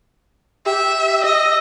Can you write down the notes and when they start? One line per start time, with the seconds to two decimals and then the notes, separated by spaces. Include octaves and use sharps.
0.66 G4 E5
1.24 D#5 E6